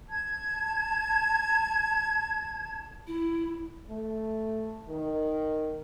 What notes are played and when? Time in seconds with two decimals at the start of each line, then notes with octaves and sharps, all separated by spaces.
0.10 A5 G#6
3.07 E4
3.89 A3
4.89 D#3